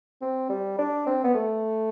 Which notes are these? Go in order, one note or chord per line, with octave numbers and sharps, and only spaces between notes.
C4
G3
D4
C4
B3
A3